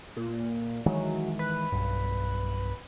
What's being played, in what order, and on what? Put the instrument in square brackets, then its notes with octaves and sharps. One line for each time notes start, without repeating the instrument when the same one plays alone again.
[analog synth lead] A#2
[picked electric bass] D#3 E3 G#3 [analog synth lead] F#3
[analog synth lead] B4
[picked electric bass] B1 G2